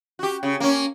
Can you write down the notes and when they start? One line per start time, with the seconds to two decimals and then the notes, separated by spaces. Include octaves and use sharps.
0.19 F#4 G4
0.43 C#3
0.60 A#3 C#4